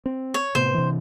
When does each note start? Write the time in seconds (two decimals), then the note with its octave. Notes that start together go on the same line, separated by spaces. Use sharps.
0.06 C4
0.34 C#5
0.55 A2 C3 B3 C5
0.74 C3 E3